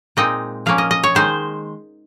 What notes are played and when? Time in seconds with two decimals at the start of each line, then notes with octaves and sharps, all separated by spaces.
0.17 A#2 G#3 C4 D#4 D#5
0.66 F3 A#3 C#4 F5
0.78 D#5
0.91 D#5
1.04 C#5
1.15 D#3 G#3 D#4 C5